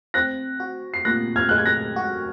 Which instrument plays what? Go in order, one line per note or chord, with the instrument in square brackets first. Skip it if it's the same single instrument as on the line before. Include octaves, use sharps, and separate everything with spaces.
[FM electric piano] C4 [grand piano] F#6 A#6
[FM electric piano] F#4
[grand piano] C7
[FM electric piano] A#2 [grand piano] F#6 A#6
[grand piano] F6 G#6
[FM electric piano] G#3 [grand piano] F#6
[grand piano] G#6
F#6 A#6
[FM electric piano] F#4